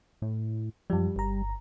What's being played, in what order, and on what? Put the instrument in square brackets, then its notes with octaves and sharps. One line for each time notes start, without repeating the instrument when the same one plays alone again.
[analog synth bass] A2
[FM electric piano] F#2 F3 [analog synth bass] G3
[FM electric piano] G1 A#5